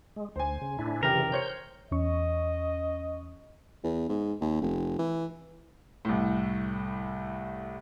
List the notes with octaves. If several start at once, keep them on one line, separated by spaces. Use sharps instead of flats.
G#3
D2 C5 G#5
C#3
A2 D4 E4
F1 C#3 E3 G4 A#4 G5
C5 C#5 G6 C#7
E2 C#4 D#5 C#6
E2
G#2
D#2
F1
E3
C2 A2